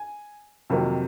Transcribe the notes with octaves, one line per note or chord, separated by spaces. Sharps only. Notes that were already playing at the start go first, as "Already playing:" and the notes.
Already playing: G#5
F2 C3 D#3 F#3 A#3